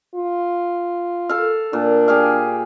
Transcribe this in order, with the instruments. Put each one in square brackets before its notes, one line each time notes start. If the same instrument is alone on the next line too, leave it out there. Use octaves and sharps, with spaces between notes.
[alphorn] F4
[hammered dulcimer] A4 F5
[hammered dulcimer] A#2 [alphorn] D4
[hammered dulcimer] G4 G#4 F5